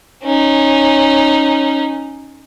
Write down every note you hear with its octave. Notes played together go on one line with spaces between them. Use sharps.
C#4 D#4